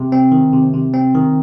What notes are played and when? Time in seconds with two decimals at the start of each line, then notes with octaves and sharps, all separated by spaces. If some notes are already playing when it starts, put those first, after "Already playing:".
Already playing: C3
0.12 C4
0.32 D#3
0.53 C3
0.73 C3
0.94 C4
1.15 D#3